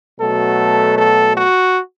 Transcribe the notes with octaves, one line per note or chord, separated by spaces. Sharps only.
B2 F#3 A3 A4
A4
F#4